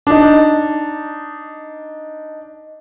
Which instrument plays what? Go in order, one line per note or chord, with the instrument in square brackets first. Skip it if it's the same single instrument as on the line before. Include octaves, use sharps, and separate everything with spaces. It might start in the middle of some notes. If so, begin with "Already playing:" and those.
[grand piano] D4 D#4